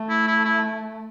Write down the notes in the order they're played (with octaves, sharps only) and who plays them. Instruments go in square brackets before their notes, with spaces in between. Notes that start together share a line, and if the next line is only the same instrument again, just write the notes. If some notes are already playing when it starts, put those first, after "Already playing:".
Already playing: [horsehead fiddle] A3
[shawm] E4
E4
E4